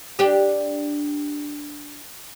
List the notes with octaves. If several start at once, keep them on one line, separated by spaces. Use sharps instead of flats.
D4 G4